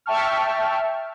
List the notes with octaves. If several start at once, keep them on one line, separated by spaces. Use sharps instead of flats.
E5 G5 A5 C#6 F6